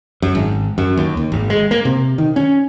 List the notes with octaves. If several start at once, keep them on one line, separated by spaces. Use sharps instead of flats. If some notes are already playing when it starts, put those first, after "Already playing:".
F#2
G#1
F#2
D#2
D#2
G#1
G#3
A#3
C3
D#3
C#4